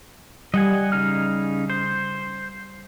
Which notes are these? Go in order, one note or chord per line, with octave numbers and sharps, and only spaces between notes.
G3 D#5 F#5 G#5
C#3 D#4 F6
C5